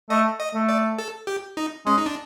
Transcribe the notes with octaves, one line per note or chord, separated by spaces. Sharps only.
A3 D#5
D#5
A3
D5
A4
G4
D#4
G#3 C#4
D#4
D4